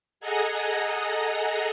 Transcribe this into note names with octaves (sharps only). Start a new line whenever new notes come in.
G#4 A4 D#5 F#5 G#5 A#5